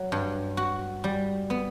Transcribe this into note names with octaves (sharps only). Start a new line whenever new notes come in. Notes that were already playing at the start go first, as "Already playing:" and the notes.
Already playing: F#3
G2
F#4
G3
B3